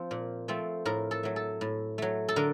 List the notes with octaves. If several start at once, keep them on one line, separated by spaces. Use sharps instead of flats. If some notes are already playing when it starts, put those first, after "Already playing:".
Already playing: F3 C4
A#2
F3 A3 C4
A2 A#4
A4
F#3 A3
A4
A2
F#3 A3
A4
D3 A#4